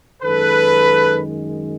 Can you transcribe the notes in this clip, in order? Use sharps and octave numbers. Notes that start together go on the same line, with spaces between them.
F#2 D#3 G#3 A4 B4